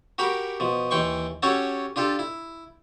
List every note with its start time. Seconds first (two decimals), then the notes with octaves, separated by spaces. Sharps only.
0.18 F#4 G4 A#4 B5 D6
0.60 B2 F3
0.91 D#2 E3 G5 C6 C#6
1.43 C#4 F#4 G4 A4 C#5 F#5
1.96 D4 F4 G4 A4
2.19 E4